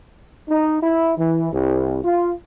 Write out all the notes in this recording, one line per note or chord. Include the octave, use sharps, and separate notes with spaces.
D#4
E4
E3
C2
F4